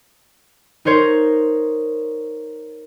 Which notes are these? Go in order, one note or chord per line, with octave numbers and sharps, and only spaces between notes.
D#4 A#4 C5 C#5